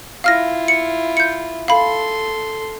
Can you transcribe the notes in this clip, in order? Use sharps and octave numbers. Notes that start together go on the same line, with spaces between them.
E4 F4 F5 F6 A#6
C#7
G6 C#7
A4 F5 B5 C6